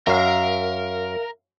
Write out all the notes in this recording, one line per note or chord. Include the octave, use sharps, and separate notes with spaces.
F#2 A#4 E5 F5